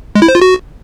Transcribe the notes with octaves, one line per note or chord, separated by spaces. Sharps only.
G#3
E4
C5
F4
F#4